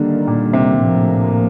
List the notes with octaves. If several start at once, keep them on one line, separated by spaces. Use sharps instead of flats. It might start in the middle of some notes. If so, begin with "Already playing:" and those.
Already playing: D3 D#3 G3 A#3
A#2
C3
A2 F3 A#3